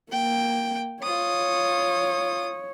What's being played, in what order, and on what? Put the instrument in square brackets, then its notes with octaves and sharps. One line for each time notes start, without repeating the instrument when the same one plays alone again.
[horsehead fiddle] A#3 [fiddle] G5
[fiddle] F4 D#6 [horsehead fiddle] C#5